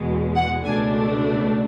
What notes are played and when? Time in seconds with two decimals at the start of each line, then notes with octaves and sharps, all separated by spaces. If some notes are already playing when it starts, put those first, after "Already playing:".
Already playing: E2 B2 G#3
0.34 F#5
0.63 C#2 B2 A3 D4 G#5